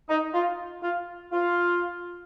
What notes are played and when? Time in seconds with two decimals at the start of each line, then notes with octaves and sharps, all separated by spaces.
0.10 D#4
0.34 F4
0.83 F4
1.33 F4